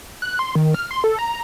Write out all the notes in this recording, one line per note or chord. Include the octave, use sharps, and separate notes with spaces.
F#6
C6
D#3
F6
C6
A4
A#5